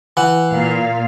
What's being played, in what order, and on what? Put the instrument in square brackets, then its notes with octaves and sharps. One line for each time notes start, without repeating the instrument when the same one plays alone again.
[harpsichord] E3 F#5
[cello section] A#2 F5